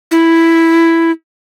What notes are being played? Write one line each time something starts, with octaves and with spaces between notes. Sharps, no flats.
E4